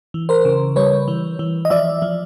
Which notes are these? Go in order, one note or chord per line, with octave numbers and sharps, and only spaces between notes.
E3
A#4 C5
C#3
G3 B4 C#5
E3
E3
D#5
F3 D5 E5
F3